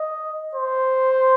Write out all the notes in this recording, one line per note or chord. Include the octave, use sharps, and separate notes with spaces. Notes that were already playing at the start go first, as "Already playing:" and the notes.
Already playing: D#5
C5